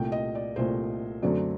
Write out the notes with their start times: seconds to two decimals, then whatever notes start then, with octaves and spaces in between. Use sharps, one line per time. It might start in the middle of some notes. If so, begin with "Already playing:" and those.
Already playing: C2 A#2 A3 G5
0.12 D#5
0.35 D5
0.56 C2 A#2 A3 C5
1.22 F#2 D3 F#3 A3 C4 D5